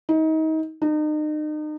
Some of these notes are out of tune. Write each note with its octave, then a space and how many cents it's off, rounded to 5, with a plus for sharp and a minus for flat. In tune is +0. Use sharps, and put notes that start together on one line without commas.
D#4 +30
D#4 -35